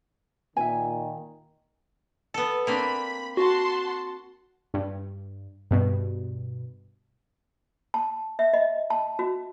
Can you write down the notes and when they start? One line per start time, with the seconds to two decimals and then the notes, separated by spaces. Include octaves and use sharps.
0.57 A#2 D#3 E5 G#5
2.34 B3 A4
2.67 A#3 C4 D4 B5
3.37 F#4 F#5 A5 C6
4.74 G2
5.71 G2 B2
7.94 A5
8.39 E5
8.53 D#5
8.90 A5
9.19 F#4